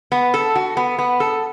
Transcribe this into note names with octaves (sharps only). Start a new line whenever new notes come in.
B3
A4
F#4
B3
B3
A4